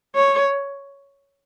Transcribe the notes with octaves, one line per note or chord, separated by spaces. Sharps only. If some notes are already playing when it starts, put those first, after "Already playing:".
C#5